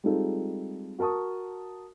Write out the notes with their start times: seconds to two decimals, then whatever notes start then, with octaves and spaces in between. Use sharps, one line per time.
0.04 G3 G#3 C4 D#4 F4 A4
0.99 F#4 A#4 A5 C#6 D#6